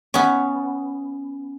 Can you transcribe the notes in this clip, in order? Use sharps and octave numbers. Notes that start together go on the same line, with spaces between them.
B3 C#4